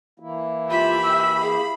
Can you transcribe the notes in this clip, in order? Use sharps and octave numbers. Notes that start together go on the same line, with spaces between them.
E3 A#3 E4
F4 G4 E5 B5
E6
G#4